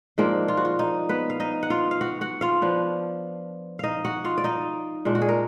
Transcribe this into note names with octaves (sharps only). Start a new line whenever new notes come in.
G#2 F3 G#3 A#3 D4 A#4
F4
F#4
F4
D#4
B3 B4
F5
D#4 D#5
F#5
F4 F5
F5
F#4 F#5
F#4 F#5
F4 F5
F3 B3 D4
D#4 D#5 F5
F#4 F#5
F4 F5
D5
D#4 D#5
A#2 G#3 D4
F#4
G#4
A#4